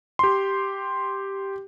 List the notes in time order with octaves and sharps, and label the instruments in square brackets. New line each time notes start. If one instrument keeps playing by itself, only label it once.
[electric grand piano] G4 C6